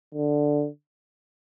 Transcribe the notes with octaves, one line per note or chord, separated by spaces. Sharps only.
D3